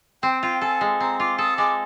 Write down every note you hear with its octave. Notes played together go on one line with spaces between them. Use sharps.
C4 G5
F4 G5
A4 G#5
G#3
C4 A#5
F4 D6
A4 D#6
G#3 D6